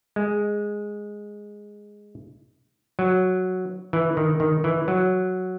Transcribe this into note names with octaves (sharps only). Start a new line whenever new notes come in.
G#3
F#3
E3
D#3
D#3
E3
F#3